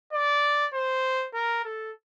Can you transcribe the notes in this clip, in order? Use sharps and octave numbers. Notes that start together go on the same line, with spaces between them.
D5
C5
A#4
A4